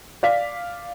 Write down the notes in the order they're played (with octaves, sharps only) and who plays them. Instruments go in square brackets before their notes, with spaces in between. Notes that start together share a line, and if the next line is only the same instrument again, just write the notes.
[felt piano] D5 F5 B6